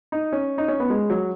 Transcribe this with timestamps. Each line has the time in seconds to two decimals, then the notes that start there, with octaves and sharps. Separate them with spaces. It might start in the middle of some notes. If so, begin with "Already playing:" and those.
0.12 D#4
0.32 C#4
0.58 D#4
0.68 C#4
0.80 B3
0.90 G#3
1.10 F#3